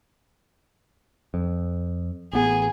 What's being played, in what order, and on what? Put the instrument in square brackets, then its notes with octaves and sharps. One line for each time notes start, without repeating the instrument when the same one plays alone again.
[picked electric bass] F2
[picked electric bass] A1 B3 [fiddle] G#4